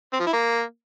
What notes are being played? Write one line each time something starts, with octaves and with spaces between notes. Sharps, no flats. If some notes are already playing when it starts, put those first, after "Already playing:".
C4
F3
E4
A#3